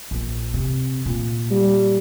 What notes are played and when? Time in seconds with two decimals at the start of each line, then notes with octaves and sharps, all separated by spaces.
0.11 A#1
0.54 C3
1.06 A#2
1.51 G3